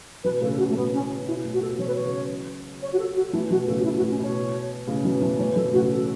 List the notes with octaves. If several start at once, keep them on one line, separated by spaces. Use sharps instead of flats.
B2 E3 B4
A2 C#3 A4
A4
B2 F#4
A3
A2 B3
C#4
B2 E4
A2
F#4
B2 A4
B2 E3 C#5
B4
C#5
C#3 F#3
C#5
F#4
A4
F#4
E3 A3 E4
B2 E3 F#4
A2 C#3 A4
F#4
B2 E4
F#4
A2
C#4
B2 C#5
A2 C#3
B2 E3
E3 A3
E3 A3 C#5
B2 E3 A4
A2 C#3 F#4
A4